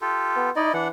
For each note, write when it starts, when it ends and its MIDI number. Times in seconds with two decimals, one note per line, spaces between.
0.01 0.50 65
0.01 0.50 67
0.01 0.50 69
0.36 0.51 59
0.56 0.73 63
0.56 0.73 64
0.56 0.73 74
0.56 0.73 75
0.74 0.90 52
0.74 0.88 62
0.74 0.88 78